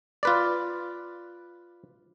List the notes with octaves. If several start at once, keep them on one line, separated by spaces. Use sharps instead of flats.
F4 B4 D5